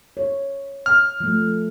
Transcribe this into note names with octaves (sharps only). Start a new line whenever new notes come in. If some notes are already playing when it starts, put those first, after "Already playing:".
C#5
F6
F3 A3